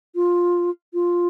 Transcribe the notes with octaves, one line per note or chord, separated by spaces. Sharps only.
F4
F4